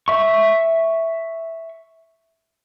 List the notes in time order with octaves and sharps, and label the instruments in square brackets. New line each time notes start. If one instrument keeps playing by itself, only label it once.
[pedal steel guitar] E5 C#6